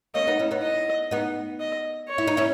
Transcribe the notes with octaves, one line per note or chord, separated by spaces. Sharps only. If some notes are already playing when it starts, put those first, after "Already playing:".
A#3 C#4 D#5
B3 D#4
C#4 E4
B3 D#4
D#5
B3 D#4
D#5
C#5
E4
D#4
C#4 E4